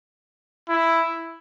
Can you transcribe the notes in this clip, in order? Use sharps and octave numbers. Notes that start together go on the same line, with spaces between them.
E4